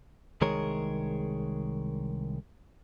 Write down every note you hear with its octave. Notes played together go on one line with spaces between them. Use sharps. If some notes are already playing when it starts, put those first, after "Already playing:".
C2 D#3 G#3 G#4 A#4 C#5